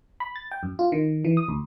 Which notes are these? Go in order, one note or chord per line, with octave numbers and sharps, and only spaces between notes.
B5
A6
G5
F#2
F4
D#3
E3
D#6
D2